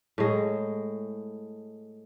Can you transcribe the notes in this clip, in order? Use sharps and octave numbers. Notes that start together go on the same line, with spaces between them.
A2 G#3